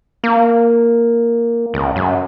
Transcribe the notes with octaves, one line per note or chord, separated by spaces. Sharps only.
A#3
C#2
F#2